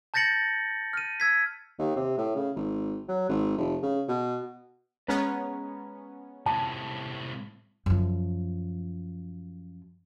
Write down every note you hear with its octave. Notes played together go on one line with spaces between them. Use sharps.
A5 G6 A6 A#6 C#7 F#7
F6 D#7
E6 G#6 B6
D#2
C3
A2
C#3
G#1
F#3
G#1
F1
C#3
B2
G#3 B3 C#4 B4 A#5
A2 C3 A5
F#2 F3